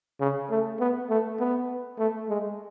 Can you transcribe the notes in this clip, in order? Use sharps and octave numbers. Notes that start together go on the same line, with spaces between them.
C#3
A3
B3
A3
B3
A3
G#3